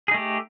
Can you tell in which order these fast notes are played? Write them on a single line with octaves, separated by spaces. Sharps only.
G#4 D#4 A3 G4